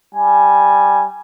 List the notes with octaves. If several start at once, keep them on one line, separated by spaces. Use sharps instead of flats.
G3 G#5